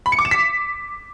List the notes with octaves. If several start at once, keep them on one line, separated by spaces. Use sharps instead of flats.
B5
C#7
D6
E7
B6